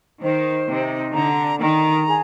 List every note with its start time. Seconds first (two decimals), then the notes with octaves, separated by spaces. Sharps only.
0.21 D#3 C5
0.67 C3 D#4
1.13 D3 A#5
1.60 D#3 A#5
2.06 G#4